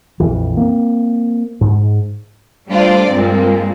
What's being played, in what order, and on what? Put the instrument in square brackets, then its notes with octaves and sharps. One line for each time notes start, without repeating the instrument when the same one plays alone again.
[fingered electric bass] A#1 F2 E3
A#3 C4
G#2
[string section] G3 A3 D4 F4 C5 D5
G2 A#2 F3 G#3 C4